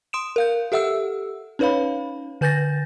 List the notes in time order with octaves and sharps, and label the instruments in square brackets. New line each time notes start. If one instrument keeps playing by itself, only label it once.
[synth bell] C6 D#6 D7 E7
A#4 F5 G6
G4 A4 E5 F#5 E6
C#4 D#4 B4 C#5 F5 B5
D3 B4 G#5 G6 A6 A#6